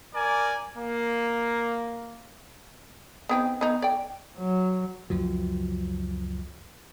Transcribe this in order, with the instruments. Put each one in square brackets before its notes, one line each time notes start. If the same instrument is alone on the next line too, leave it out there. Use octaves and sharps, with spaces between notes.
[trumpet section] A#4 D5 G#5
A#3
[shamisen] B3 C4 D#4
B3 D#4
D5 G5
[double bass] F#3
[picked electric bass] C#2 F#2 F3 F#3